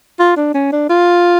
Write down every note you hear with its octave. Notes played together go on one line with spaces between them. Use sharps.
F4
D4
C#4
D4
F4